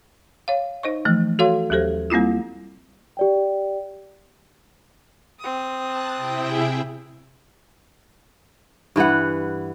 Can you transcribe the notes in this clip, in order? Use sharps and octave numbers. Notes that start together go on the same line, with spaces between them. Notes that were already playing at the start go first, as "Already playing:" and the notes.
C#5 F5
D#4 C5 D#5 C#6
E3 F3 A3
F#4 A4 C#5 F5 C6
D#2 F#3 G4 A4 C5
G3 A#3 C4 E4 F4
G4 D5 G5
C4 D#6
A5 F#6
C3 E4 G5
G#4 E5
G2 E3 B4 F#5